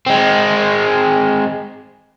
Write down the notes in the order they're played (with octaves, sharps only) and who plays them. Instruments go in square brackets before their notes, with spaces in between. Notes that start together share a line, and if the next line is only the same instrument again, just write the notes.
[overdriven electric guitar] G#3 C4